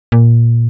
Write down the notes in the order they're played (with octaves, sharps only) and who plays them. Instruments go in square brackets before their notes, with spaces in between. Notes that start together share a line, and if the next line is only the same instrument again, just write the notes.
[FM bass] A#2